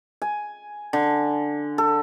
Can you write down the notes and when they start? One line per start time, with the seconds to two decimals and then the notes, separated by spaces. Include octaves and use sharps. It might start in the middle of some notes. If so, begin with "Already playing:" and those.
0.22 G#5
0.93 D3
1.78 A4